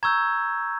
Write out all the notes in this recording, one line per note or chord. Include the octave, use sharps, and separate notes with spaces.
A#5 C#6 E6 G6 G#6